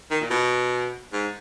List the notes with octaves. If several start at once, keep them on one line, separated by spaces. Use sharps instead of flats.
D#3
A#2
B2
G#2